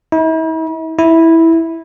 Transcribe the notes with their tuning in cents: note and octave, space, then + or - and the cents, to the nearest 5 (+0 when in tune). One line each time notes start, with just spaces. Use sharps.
E4 -45
E4 -10